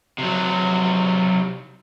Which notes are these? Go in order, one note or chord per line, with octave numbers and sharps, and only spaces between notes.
C3 F#3